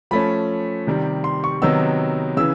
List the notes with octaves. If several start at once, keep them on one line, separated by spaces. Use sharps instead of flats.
F3 A3 C#4 B5
C3 D#3 G3
C6
C#6
C3 D#3 F#3 B3 D#4 E6
C#3 E3 E6